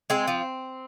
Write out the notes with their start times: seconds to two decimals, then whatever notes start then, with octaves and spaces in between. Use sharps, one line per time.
0.10 G#3 C4
0.28 F3